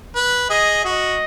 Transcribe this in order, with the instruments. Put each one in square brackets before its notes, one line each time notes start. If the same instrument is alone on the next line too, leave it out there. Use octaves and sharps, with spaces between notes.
[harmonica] B4
[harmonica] G#4 [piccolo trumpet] D#5
[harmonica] F#4 [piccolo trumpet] D#5